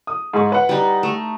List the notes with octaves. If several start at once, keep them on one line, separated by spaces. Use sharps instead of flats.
D#6
G#2 G#4 C#6
B4 F#5
G3 D#4
A3